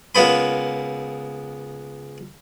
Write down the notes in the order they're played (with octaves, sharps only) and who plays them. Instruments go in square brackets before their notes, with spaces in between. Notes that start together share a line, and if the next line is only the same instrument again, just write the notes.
[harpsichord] C#2 A#3 B3 B5